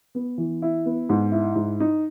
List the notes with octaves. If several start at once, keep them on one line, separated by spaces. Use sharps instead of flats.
B3
E3
E4
B3
G#2
E4
G#2
D#4